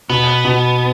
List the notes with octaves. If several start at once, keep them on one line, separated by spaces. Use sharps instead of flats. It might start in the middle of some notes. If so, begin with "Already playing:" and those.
B2 B3
B2